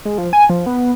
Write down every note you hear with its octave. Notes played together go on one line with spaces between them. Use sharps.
G#3
F3
G#5
F3
B3